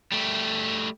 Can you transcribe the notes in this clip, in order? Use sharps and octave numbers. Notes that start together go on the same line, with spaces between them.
G3 A3